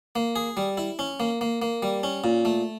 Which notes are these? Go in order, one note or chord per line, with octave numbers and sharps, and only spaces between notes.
A#3
G#4
G3
E4
C#4
A#3
A#3
A#3
G3
C#4
A#2
A3